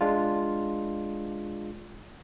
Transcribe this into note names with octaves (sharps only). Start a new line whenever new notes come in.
G#3 D4 F4